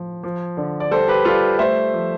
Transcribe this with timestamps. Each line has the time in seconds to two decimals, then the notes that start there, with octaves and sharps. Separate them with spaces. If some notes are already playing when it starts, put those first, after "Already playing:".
Already playing: A2 F3
0.23 F3
0.57 D3
0.80 D5
0.91 G3 A4 C5
1.08 G4 B4
1.25 G3 F4 A4
1.59 A3 C5 E5
1.93 F3